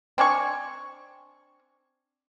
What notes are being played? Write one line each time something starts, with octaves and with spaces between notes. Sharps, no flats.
C4 D4 G#5 C#6